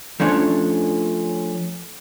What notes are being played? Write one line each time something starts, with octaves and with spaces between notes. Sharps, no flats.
F3 A3 C#4 D4 C#5